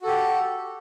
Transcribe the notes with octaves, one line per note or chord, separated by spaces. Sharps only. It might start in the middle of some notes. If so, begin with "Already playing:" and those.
F#4 G4 A4